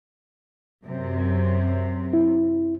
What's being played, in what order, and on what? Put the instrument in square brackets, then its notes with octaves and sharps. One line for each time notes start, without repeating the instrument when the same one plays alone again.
[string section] F#2 C3
[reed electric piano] E4